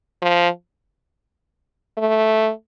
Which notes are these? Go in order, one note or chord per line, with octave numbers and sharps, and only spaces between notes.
F3
A3